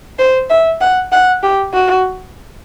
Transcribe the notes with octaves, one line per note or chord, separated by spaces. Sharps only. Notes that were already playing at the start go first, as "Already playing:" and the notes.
C5
E5
F#5
F#5
G4
F#4